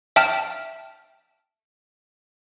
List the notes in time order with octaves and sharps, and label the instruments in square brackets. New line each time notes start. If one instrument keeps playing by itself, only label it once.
[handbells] E5 G5 A5 F6